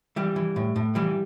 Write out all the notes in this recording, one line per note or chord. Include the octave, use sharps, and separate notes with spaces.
E3 G3
E3
A2
A2
E3 G3